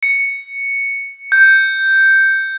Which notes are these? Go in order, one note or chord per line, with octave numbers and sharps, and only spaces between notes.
C#7
G6